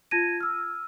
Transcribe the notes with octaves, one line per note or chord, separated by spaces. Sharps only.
F4 A5 G#6 A#6 D#7
E6 F6